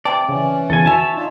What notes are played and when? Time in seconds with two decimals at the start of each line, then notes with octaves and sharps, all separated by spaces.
0.05 C3 B4 D5 G5 A5
0.29 C#3 E3 C#4
0.70 E2 C#3 A4 G#5
0.86 F#4 C#5 E5 F#5 G#5 A5
1.15 D4 D#4 F4